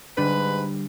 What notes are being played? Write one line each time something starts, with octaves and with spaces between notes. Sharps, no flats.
G#2 D3 G3 D4 B4